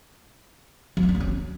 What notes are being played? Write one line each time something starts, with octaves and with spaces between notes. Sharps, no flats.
F3
C#4
D4
A#3
C#4